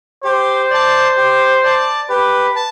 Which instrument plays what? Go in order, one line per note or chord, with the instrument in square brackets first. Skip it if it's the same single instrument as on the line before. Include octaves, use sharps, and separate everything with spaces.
[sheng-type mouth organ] G4 [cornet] C5
[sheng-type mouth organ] D5 A5
G4
D5 A5
[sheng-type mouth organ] G4 [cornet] B4
[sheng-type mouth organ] A5